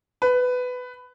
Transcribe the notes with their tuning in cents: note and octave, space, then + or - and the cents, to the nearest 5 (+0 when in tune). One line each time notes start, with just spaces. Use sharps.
B4 +15